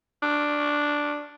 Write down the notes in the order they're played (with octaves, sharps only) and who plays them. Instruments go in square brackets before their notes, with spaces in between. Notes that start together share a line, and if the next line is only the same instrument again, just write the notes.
[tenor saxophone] D4